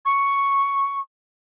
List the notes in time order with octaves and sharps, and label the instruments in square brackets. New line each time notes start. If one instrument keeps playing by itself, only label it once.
[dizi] C#6